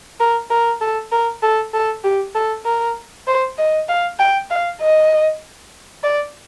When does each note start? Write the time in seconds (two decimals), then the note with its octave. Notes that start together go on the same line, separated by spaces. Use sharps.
0.20 A#4
0.50 A#4
0.81 A4
1.12 A#4
1.43 A4
1.74 A4
2.04 G4
2.35 A4
2.65 A#4
3.27 C5
3.58 D#5
3.89 F5
4.19 G5
4.50 F5
4.81 D#5
6.03 D5